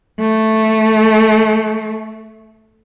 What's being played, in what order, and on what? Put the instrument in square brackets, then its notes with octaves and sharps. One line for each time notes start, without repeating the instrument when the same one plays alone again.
[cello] A3